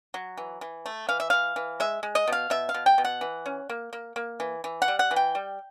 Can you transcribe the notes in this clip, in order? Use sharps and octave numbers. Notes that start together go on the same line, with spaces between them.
F#3
E3
E3
A3
E3 F5
E5
E3 F5
E3
G#3 E5
G#3
D#5
B2 F5
B2 E5
F5
B2
G5
B2
F#5
E3
C#4
A#3
A#3
A#3
E3
E3
F#5
G3
F#5
E3
G5
G3